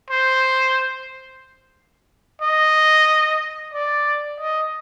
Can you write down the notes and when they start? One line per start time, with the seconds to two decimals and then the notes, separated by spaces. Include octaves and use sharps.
0.10 C5
2.41 D#5
3.74 D5
4.40 D#5